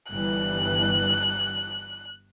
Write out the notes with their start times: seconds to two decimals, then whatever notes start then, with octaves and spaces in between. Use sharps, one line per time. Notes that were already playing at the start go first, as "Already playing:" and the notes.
0.11 G1 E3 G3 F#6